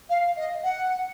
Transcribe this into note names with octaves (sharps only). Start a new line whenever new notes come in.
F5
D#5
F#5